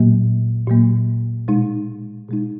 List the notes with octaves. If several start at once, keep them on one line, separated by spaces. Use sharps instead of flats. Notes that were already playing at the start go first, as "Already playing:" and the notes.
Already playing: A#2 F#3 A#3
A#2 F#3 A#3
B2 G#3 D#4
B2 G#3 D#4